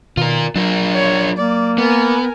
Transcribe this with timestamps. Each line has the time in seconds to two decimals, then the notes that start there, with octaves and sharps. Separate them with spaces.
0.17 B2 D#3 F4 A#4
0.56 F#3 D4 F4 A#4
0.93 C#5
1.38 A#3 D5
1.78 B3 A#4 G#5